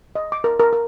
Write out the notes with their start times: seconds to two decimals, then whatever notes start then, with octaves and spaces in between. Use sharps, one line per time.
0.15 D#5
0.32 D6
0.44 A#4
0.60 A#4
0.73 A#4